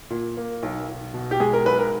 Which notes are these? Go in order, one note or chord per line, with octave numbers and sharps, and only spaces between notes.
A#2
A#3
B1
B1
B2
G4
G#3 G#4
A#4
B1 B4
A#4